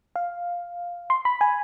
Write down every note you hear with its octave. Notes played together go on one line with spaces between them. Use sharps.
F5
C6
B5
G#5